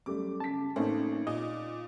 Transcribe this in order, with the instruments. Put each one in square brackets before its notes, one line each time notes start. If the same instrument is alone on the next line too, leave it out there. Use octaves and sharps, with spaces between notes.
[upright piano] F#2 G3 A3 [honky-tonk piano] D6
[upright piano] C#3 B6 [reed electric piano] A5
[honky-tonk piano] A1 [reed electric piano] A3 C4 C#4 [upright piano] A#3 D#4
[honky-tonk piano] A#2 [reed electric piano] D#5